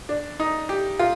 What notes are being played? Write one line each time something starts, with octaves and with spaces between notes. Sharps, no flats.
D4
D#4
G4
F4